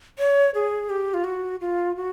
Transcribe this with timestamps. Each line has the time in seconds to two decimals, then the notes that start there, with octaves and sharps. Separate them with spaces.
0.19 C#5
0.55 G#4
0.90 G4
1.14 F4
1.24 F#4
1.61 F4
1.96 F#4